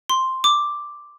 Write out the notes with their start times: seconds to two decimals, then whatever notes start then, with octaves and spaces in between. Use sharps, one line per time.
0.09 C6
0.44 D6